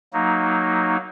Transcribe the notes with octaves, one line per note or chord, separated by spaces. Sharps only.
F#3 A#3 D#4